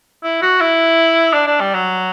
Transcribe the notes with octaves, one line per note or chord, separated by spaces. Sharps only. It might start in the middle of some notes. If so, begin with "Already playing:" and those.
E4
F#4
E4
D4
D4
G3
F#3